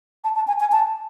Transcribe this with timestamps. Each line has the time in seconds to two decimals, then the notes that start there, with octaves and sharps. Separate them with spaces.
0.24 A5
0.36 A5
0.48 G#5
0.60 G#5
0.72 A5